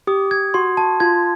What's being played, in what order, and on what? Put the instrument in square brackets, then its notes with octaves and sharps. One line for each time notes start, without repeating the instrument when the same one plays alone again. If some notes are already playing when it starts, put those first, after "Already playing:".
[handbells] G4 [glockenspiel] D#6
[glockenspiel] G#6
[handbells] F#4 [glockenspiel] C6
[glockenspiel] A5
[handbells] F4 [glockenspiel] G#6